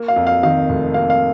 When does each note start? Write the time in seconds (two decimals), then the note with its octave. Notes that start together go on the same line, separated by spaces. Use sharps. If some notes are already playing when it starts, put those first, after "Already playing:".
Already playing: A#3
0.08 F5
0.16 F2
0.27 F5
0.43 D#3 F5
0.69 F1
0.94 A#3 F5
1.10 F5